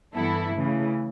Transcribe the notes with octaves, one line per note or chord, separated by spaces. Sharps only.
G2 E3 B3 E4 A4
C#3 E3 A3